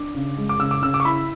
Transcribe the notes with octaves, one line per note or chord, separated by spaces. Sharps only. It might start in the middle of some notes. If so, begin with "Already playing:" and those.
Already playing: D4 D6
C#3
G#3
D6
C#3 E6
D6
C#3 E6
D6
C#6
E4 B5